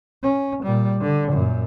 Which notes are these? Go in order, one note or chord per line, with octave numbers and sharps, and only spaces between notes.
C#4
A#2 G3
D3
F#2 A#2